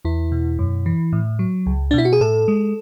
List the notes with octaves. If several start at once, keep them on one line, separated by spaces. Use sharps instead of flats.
E2 E4
B2
F#2
E3
A2
F#3
C#2
D4
B2 E4
F#4
G#4
A2 A4
G#3